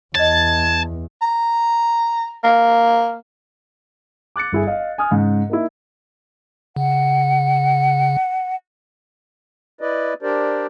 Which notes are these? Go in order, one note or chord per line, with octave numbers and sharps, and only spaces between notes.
E2 C#5 D#5 A5 G#6
A#5
A#3
D6 F#6 A6 C#7
G1 E4 G#4
D#5 F5
G#5 D#6 F6
G#2 C#3
A#3 D#4 E4
C#3 F#5
E4 B4 D5 D#5
D4 G4 A#4 C5 D5